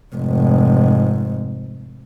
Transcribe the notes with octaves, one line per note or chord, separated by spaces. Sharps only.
F1 G#2